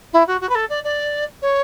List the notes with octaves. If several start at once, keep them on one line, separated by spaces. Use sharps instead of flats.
E4
F#4
F#4
B4
A4
D5
D5
C#5